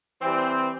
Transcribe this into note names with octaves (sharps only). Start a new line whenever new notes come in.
E3 G3 C4